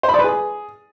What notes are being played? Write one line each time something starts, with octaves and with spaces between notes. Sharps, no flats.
C5
B5
D5
B4
G#4